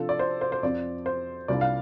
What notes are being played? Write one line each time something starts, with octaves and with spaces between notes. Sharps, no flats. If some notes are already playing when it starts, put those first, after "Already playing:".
Already playing: C3 F3 D4 F4 A4
D5
C5
C5
C5
F2 F3 C4 D5
C5
C2 C3 G3 D4 F4 D5
F5